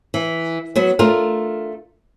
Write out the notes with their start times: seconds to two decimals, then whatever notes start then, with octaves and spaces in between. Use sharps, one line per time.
0.14 E3
0.76 F#3 B3 F#4
0.99 A3 D4 F4 A#4